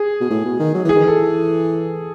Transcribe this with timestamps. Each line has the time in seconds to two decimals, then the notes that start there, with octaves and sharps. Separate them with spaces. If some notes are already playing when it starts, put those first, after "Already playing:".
Already playing: G#4
0.20 B2
0.30 A2
0.45 B2
0.59 D#3
0.74 F#3
0.85 E3 G#4
0.95 D#3
1.05 E3 A4